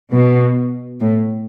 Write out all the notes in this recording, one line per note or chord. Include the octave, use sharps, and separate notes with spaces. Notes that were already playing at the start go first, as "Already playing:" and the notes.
B2
A2